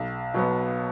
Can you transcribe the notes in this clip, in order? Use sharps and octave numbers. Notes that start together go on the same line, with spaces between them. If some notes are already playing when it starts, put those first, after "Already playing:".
Already playing: B1
B2 F#3 B3